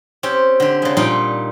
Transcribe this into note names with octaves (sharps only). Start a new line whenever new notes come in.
C4 C#4 G4
D3 G4
C#3 G#3
A#2 G3 D#4 F4 G5